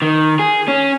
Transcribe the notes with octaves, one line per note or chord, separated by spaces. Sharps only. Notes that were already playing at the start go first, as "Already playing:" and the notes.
D#3
G#4
C#4